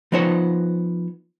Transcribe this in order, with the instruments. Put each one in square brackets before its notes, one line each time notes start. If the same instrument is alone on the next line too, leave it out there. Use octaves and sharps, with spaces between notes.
[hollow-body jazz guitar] F3 B3 D#4 C5 C#5